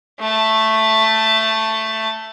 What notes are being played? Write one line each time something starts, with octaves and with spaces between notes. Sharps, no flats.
A3 A5